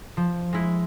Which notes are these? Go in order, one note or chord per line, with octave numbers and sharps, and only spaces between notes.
F3
G#3 E4